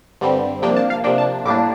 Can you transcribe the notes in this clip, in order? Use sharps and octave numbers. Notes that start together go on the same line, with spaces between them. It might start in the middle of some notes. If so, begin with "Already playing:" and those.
G2 D3 G3 C4
C3 F3 A#3 D4 G5
A5
F5
C3 F3 A#3 D4 G5
A5
A2 G3 A#3 D4 D6